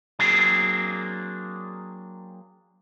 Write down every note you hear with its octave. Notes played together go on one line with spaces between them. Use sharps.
F#3 A#3 C4 D4 G#4